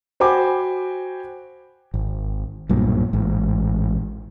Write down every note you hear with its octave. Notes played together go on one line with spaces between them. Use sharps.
F#4 C5 G5 G#5 B5 D6
G#1
B1 G2 A#2
A1 G#2